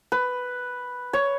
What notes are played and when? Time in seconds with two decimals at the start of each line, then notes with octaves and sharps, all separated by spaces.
0.12 B4
1.13 C#5